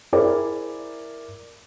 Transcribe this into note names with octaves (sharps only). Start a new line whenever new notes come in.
E4 G#4 A#4 C5 D5